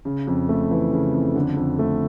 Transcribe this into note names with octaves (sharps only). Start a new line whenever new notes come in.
C#3
F2
A3
E3
C#3
F2
D3
F2
A3